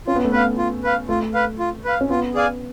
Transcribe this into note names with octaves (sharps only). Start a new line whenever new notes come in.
C#4 F4
B3
A3
B3 B4 F5
F4
B4 F5
A3 F4
B4 F5
F4
B4 F5
C#4
B3 F4
G#4 D5 F5 G#5